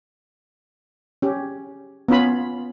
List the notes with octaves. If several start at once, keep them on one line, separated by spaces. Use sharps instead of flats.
C#4 G4
B3 C#4 F4 B5